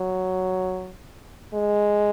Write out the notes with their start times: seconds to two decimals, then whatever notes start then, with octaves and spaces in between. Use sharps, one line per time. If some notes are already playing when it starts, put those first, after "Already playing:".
Already playing: F#3
1.54 G#3